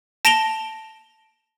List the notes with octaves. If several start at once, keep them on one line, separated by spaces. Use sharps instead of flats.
A5 A#6 D7 E7 F7 G7